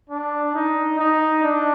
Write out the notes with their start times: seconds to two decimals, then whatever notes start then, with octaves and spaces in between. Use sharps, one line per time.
0.10 D4
0.54 D#4
0.99 D#4
1.43 D4